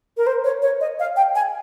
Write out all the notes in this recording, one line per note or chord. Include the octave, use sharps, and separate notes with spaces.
A#4
C5
C#5
C#5
D#5
F5
G5
G#5